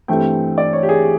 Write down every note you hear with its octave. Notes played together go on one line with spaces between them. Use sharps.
G2 E3 A3 C4 G5
D5
C#5
G4
G#4